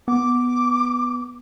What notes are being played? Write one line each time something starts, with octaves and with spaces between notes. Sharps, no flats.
B3 D6